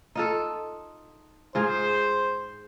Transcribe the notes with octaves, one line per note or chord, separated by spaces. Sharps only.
D#4 F4 A4
G#2 F4 G#4 C5